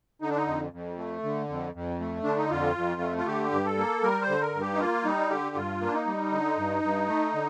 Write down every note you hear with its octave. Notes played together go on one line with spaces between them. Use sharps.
D3 D#4
D4
D#4
F2
F2
A3
D3
F2
F2
A3
D3 D4
D#4
F2 F4
F2
A3
F4
D3 G4
G2
A4
A#3
G3 A#4
C5
D3
A#4
G2
G4
D#4
A#3 F4
G3 D#4
D3 G4
G2 F4
A#3
D4
D#4
G3
D3
G2
G2
A3
D3